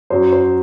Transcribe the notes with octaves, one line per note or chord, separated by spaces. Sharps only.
F#2 F#3 C5
C5